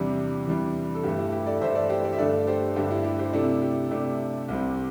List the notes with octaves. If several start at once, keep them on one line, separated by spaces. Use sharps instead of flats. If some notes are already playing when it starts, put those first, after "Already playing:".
Already playing: E2 C3 E3 G3 D4 G4
E2 C3 E3 G3 D4
A4
G2 E3 A3 G4
E4
G4
A4 D5
G2 E3 A3 C5 E5
A4 D5
G4 C5
A4 D5
E5
G2 D3 A3 A4 D5
G4 C5
G2 D3 A3 G4
E4
G4
G4 C5
C3 A3 D4 E4 A4
G4
C3 A3 D4 G4
C2 C3 G3 C4